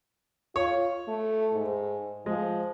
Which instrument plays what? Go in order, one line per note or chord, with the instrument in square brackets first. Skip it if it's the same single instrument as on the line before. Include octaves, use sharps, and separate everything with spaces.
[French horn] F4 [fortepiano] C#5
[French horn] A3
G#2
[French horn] F3 [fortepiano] G#3